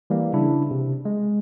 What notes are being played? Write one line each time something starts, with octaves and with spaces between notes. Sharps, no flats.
E3 G3 A#3
C#3 D4 E4
C3
G#3